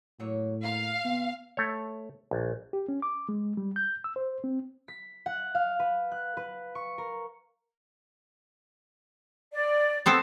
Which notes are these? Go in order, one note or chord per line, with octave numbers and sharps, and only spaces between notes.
A2 F#3 A#3 C#5
A#3 F5 F#5 A#5
C3 B3
A3 C#5
A#1
G4
C#4
D6
G#3
G3
G6
E6
C5
C4
B6
F#5
F5
B4
F#6
B4
C#6
A#4
D5
B3 C4 A4